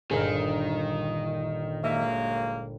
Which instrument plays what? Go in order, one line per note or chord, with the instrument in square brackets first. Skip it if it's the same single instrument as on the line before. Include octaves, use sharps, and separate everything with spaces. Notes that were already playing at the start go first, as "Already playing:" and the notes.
[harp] G1 A#2 D#4 [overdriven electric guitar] D#3 [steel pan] G#4 A#4
[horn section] F#3 G#3 A#3 [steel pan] E5